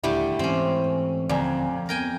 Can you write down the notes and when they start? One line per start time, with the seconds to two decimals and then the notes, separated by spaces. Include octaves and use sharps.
0.04 D#1 D3 G3 A3 E4 G4
0.39 G#2 E3 C4 C#4
1.29 D#1 F2 D3 C4 D5 G#5 A#5
1.89 F3 B3 A#4 G5 G#5